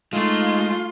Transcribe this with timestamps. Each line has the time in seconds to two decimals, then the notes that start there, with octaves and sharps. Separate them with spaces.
0.13 G#3 A3 D#4 F4 C6